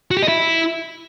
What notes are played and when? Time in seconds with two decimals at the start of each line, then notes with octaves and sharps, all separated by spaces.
0.11 F#4
0.17 G4
0.23 D#5
0.28 E4